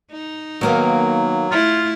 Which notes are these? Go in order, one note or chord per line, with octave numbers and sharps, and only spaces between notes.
D#4
D#3 F#3 A#3 B3
A3 E4 F4